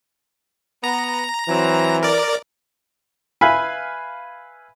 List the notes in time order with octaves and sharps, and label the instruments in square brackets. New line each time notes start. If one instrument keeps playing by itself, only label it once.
[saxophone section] B3 [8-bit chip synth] A#5
[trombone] E3 [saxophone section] F#3 C4
[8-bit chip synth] A#4 D5
[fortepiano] B4 E5 F5 G#5 B5